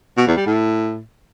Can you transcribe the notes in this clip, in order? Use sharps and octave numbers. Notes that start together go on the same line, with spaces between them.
B2
E2
G3
A2